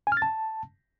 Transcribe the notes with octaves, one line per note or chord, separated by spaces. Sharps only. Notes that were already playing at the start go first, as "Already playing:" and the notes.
G#5
F6
A6
A5